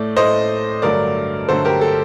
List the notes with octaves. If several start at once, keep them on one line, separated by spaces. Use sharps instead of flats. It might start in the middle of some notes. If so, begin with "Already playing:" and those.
Already playing: A2 A3 D5
A2 A3 C5 D#5
G2 D3 F#3 A3 A#4 D5
G2 D3 F#3 A3 A4 C5
G4 A#4
A4